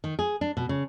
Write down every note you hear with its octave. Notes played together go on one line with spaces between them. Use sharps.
D#3
G#4
D4
B2
C#3